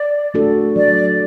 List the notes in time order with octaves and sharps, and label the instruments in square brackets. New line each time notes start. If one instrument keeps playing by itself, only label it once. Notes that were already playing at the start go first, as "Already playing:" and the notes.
Already playing: [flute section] D5
[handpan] A3 D4 F#4 A4
[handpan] F#3 [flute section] D5